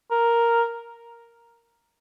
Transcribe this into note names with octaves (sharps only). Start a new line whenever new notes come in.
A#4